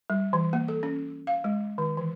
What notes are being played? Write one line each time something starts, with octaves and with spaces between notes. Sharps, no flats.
G3
E3
A#3
A4
C#4
F5
G#3
D#3
E3